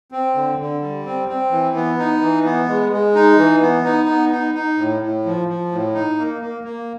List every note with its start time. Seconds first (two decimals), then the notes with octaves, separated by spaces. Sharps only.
0.12 C4
0.35 D3
0.59 D3
0.82 G3
1.06 C4
1.28 C4
1.51 E3
1.75 B3
1.99 D#4
2.21 E3
2.45 B3
2.68 G#3
2.92 G#3
3.15 D#4
3.38 E3
3.62 B3
3.85 D#4
4.09 B3
4.32 D#4
4.55 D#4
4.78 A2
5.02 A2
5.25 F3
5.48 F3
5.72 A2
5.95 D#4
6.19 A#3
6.42 A#3
6.64 A#3